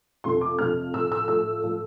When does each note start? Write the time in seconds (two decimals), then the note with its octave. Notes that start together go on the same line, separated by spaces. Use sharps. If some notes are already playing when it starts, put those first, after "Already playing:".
0.24 F2 C3 F3 A3 C6
0.41 D6
0.59 F2 C3 F3 A3 F6
0.93 A2 F3 A3 E6
1.12 E6
1.28 A2 F3 A3 E6
1.63 A2 F3 A3